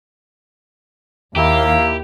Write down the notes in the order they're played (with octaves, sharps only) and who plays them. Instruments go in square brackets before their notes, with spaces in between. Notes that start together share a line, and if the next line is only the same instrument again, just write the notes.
[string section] D#2 [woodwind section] A#3 E4 [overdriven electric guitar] G4 [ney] F5